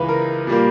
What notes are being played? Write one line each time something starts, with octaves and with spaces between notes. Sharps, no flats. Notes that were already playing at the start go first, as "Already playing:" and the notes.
Already playing: C#2 C#3 E3 G#3 B4
A#4
A#2 G3 A#3